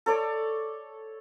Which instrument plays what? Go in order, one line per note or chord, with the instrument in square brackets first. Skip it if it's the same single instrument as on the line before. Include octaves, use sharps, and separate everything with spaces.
[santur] A4 C#5 D5